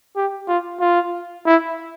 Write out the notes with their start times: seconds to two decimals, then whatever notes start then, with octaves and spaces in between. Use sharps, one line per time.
0.16 G4
0.48 F4
0.80 F4
1.46 E4